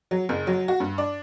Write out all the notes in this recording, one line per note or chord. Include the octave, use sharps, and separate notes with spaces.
F#3
F#1
F#3
F#4
G2
D4